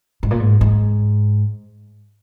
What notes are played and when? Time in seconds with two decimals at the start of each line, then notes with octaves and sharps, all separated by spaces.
0.23 G#2
0.31 A#2
0.40 G#2
0.61 G#2